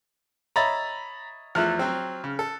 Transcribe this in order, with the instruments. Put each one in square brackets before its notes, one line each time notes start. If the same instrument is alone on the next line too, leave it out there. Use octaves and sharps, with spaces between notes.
[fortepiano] C#5 D#5 E5 [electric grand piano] A#5 B5 A6
[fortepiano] E2 F3 A3 [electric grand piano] F6 F#6
[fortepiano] F#3 C4
C#3
A4